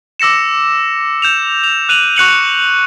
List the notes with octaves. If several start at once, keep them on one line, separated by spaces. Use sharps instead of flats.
D6 E6 A#6 C#7 E7
G6 E7 F7
F7
F#6 D#7 F7 F#7
C#6 F#6 C#7 F#7